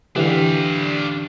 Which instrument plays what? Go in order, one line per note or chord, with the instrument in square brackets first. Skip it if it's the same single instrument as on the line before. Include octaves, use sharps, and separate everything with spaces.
[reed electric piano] D3 E3 G4 [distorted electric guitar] D4 F5